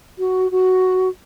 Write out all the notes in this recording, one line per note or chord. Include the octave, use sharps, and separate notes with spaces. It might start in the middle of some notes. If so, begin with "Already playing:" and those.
F#4
F#4